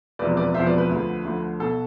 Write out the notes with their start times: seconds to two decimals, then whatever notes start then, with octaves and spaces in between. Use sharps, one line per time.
0.19 E1 E2 C3 F3 B4 D5
0.37 B4 D5
0.54 E1 E2 C3 F3 C5 E5
0.66 B4 D5
0.78 B4
0.90 D2 D3 F3
1.25 D2 D3 F3
1.60 B1 B2 A4